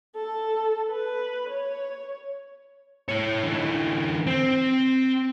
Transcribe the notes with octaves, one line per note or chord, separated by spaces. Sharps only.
A4
B4
C#5
E4 C#5
D3 E3
C4